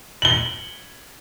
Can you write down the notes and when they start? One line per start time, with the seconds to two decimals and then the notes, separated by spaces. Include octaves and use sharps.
0.22 F#7 G7